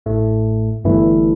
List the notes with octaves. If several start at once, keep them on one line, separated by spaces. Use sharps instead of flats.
A1 A2 A3
G1 G2 E3 A3 E4